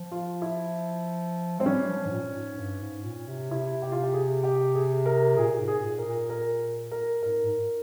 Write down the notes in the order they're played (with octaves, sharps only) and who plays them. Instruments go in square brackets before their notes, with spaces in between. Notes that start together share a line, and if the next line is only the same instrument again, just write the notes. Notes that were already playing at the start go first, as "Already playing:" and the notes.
Already playing: [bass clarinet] F3
[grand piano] F4
E4
[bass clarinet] G#3 [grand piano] C4
[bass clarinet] G3 [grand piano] C#4
[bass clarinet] F3
G#2
A#2
G#2
G2
G#2
A#2
C3
[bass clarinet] C3 [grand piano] E4
[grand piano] G4
F4
G4
G#4
G4
G#4
A#4
[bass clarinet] A#2 [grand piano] G#4
[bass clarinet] A#2
G#2
[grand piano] G#4
[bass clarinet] A#2
[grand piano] A#4
[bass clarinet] A#2
[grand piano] A#4
A#4
[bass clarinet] G#2 [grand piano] A#4
[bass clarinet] G#2